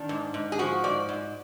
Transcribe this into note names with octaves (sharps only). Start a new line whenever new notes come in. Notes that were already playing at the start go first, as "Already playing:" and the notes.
Already playing: D#3 D4
G#2
G#2
G#4
F3 F#4
G#2 D5
G#2